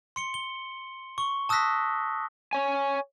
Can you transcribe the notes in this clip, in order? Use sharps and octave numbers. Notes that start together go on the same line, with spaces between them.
C6 C#7 G7
G7
C#6 G7
A5 D#6 E6 F#6 A#6 B6
C#5 G#5